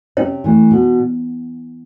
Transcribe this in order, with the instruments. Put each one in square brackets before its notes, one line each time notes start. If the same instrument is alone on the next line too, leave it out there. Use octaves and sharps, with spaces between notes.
[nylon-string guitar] C3 [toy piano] C#4 C#5
[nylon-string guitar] E3 A3
B2